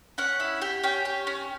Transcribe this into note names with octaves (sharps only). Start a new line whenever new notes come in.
C#4 F#5
E4
G4
C#4 G5
G4
C#4